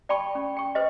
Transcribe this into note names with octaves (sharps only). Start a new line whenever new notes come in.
D5 G5 A5 B5 C#6
C#4
G5 C#6
B4 C5 D#5